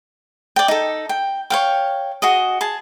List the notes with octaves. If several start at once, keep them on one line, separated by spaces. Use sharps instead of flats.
D5 G5
D#4 A4
G5
C#5 F5 G5
F#4 G#4 D#5
G#4 A5